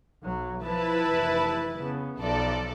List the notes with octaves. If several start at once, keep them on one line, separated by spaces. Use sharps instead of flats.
B1 F#3
F3 E4 B4 A5
F1 E3
C#3 B3
B1 F3 A4 D5